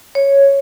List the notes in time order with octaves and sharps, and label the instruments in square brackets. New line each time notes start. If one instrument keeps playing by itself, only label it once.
[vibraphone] C#5